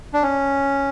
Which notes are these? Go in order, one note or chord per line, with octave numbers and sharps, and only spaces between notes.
D4
C#4